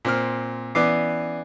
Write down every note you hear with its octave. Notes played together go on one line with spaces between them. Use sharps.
A#2 C4 F6
E3 B3 C#4 D5 D6 C7